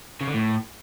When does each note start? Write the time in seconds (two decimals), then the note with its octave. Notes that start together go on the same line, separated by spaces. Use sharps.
0.21 C#3
0.28 D3
0.34 A2